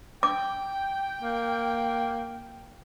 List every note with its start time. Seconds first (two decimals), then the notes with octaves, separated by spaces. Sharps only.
0.23 G5 D6
1.22 A#3